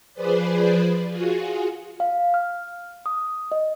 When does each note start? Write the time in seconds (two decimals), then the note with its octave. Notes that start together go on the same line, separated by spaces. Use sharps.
0.14 F3 G#4 B4 C5 D5
1.09 F4 F#4 G#4
2.00 F5
2.34 F6
3.06 D#6
3.52 D#5